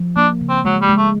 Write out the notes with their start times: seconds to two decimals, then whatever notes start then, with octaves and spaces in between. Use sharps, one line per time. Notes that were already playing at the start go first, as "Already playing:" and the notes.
Already playing: F3
0.16 A#3 D4
0.41 C#3
0.49 C4
0.65 F#3 G#3
0.82 G3
0.90 G#3
0.98 A3